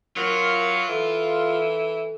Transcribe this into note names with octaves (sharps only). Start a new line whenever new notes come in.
F#3 F4 A#4
E3 A4